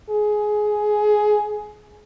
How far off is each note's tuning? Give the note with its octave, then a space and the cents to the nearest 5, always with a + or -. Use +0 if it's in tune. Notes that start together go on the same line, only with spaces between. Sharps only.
G#4 +15